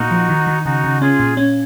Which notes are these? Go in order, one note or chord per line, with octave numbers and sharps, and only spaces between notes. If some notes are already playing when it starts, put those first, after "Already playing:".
Already playing: A#2 A#3 D#4 F#4
F3
D#3
D#3
C#3 D#4 F#4
C#3
C#4 F4 G#4
A#2
C#4